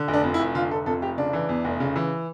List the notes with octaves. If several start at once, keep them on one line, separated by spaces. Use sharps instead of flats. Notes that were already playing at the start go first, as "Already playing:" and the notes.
Already playing: D3
F1
D4
F2
E4
F1
D3 F4
F1 A4
F2 A4
F1 G4
C#3 D4
E3
E2
F1
C#3
E3